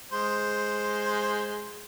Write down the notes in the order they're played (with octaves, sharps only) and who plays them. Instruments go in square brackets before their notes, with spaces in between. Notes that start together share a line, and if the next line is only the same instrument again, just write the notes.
[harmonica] G#3 C5